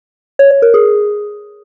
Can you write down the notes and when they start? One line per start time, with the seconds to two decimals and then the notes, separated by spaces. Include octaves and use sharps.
0.39 C#5
0.51 C#5
0.62 A#4
0.74 G#4